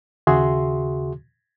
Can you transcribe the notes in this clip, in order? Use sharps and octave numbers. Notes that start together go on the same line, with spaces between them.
D#2 C#3 F#4 G#4 E5 C6